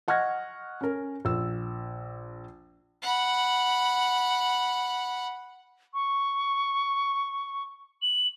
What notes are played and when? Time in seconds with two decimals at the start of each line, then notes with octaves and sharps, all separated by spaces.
0.08 D#5 F#5 C#6 F6 G#6 A#6
0.81 C#4 A#4
1.25 A#1 E6
3.03 F#5 B5
5.94 C#6
8.02 F#7